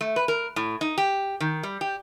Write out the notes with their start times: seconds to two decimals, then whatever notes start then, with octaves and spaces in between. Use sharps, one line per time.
0.01 A3
0.16 B4
0.28 A#4
0.56 A2
0.81 D#4
0.98 G4
1.40 D#3
1.63 G3
1.81 G4